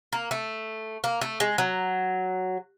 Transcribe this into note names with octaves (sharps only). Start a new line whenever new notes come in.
A#3
A3
A#3
A3
G#3
F#3